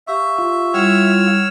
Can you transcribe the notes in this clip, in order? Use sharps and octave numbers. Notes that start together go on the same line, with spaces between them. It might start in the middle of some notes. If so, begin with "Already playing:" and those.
G4 E5 F5 C#6
F4
G3 E4 C#5 F#5 E6 F6